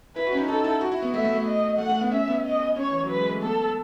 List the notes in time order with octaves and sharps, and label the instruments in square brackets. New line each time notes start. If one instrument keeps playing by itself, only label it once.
[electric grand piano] E4 [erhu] B4
[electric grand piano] F#4
C#4
D#4
[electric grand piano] D#4 [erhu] A4
[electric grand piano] E4
F#4
E4
B3
[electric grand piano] A3 [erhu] E5
[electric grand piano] A3
A3
[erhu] D#5
[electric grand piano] A3 [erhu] F#5
[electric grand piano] A3
B3
[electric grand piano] C#4 [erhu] E5
[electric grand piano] B3
[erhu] D#5
[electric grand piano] C#4 [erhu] C#5
[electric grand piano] E3
F#3
[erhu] B4
[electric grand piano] G#3
A3
[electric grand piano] B3 [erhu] A4